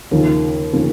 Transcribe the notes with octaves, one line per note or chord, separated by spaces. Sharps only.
D#2 C#3 F3 A#3
C#3 F3 A#3